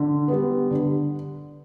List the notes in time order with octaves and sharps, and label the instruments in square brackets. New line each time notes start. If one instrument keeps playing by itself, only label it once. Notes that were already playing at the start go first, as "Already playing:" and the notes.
Already playing: [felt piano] D3
G3 B3
D3